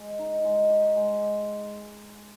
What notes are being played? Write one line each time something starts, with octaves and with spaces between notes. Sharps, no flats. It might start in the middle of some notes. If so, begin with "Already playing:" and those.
Already playing: G#3
D#4
G#3
G4
G#3